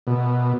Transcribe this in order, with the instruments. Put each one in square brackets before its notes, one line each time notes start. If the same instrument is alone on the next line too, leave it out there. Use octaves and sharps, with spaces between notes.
[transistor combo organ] B2